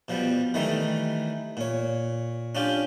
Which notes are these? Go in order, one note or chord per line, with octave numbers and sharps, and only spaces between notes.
B2 F3 G3
D#3 E3 G3 A3 D#4
A#2 C#5
C#4 D4 F4 G4